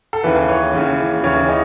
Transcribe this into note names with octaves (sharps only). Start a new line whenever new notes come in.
A4
D#2 C#3 E3 B4
C#5
D#2 C#3 E3
D#2 C#3 E3 C#5
D#5